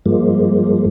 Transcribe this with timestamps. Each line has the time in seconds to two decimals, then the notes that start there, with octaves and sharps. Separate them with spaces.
0.06 G2 F3 G#3 A#3